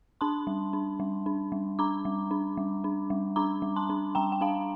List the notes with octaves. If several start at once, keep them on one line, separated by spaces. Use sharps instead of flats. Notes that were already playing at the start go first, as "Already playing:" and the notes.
D4 A5 C6
G3
D4
G3
D4
G3
D4 A#5 D6
G3
D4
G3
D4
G3
D4 A#5 D6
G3
A5 C6
D4
G3 G5 A#5
G5
D4 F5 A5